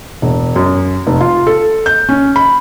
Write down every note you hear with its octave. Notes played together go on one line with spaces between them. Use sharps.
E1
F#2
F1
F4
A4
G6
C#4
B5